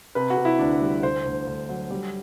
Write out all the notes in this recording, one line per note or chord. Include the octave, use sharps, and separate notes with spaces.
C3 B4
F#4
C3
E4
D2 D4
G3
D2 C5
D2
D2
F#3
G3